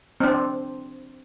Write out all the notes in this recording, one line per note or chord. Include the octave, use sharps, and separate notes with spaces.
C4 D4